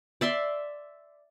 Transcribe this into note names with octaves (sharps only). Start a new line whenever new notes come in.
D5 E5 C6